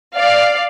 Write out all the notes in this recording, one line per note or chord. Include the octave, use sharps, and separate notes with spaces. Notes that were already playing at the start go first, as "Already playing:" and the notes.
D5 F5